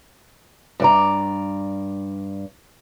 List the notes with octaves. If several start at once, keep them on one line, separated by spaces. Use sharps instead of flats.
G2 D5 A#5